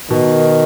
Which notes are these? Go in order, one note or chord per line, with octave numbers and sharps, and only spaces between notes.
B2 D#3